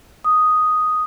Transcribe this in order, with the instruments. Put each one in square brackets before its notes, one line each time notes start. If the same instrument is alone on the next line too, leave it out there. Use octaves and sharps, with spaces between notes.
[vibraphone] D#6